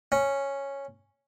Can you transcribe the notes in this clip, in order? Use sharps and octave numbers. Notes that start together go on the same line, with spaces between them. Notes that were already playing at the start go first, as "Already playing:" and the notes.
C#4